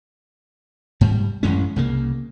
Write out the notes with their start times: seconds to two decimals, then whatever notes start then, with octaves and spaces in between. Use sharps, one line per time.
1.01 G#2 G3
1.43 A1 F#2 G#3 C#4
1.76 C2 C#3 A#3